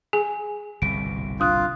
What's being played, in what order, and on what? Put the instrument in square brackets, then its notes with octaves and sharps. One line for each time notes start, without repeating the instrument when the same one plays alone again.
[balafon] G#4 [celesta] G#5
[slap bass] G1 C2 B2 [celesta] D7
[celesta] D4 D#6 F#6 [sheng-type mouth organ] F4